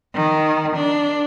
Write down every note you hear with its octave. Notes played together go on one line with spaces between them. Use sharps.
D#3
D4